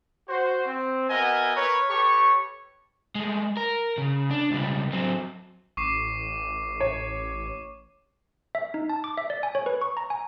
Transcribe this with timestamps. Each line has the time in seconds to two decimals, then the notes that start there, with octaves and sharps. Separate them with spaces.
0.28 F#4 C5
0.66 C4
1.10 B3 F#4 A#4 D#5 E5 G#5
1.55 A#4 B4 C#5
1.88 G4 A4 B4 C#5 C#6
3.15 G#3 A3
3.57 A#4
3.98 C#3
4.30 D4
4.51 C#2 G3
4.92 F#3 C4
5.77 A1 C#6 D6 C7
6.80 C#5
8.55 E5
8.74 D#4
8.89 A5
9.04 D6
9.17 E5
9.30 D5
9.43 G#5
9.55 C#5
9.66 B4
9.81 C#6
9.97 A#5
10.10 G#5